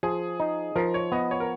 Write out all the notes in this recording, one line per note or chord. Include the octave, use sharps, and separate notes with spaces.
F3 G#4
D#4
F3 A#4
C#5
B3 D#5
C#5
A#4